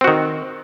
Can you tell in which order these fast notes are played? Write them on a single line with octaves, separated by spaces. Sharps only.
C4 F#4 D#3